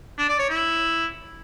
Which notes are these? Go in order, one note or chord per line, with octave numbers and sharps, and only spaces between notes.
D4
D5
C#5
E4